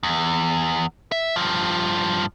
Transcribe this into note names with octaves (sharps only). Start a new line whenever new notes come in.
E2
E5
G2 F3